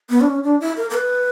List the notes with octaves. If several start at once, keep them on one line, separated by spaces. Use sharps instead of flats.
B3
D4
C#4
D4
E4
A#4
A#4
B4